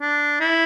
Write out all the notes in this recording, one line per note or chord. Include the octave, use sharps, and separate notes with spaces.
D4
E4